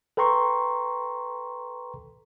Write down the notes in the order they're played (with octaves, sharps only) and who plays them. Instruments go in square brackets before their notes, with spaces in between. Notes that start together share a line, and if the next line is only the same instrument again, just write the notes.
[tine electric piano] A4 B4 G5 A#5 C6 C#6